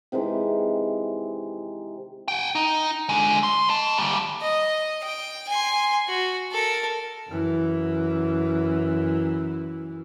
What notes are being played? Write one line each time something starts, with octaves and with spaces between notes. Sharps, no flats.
C3 D#3 E3 G#3
F#5 G5
D#4
D3 G#3
C6
D#5 A5
A#2 G3
D#5
G5
G#5 C6
F#4
A4 A#4
F#2 E3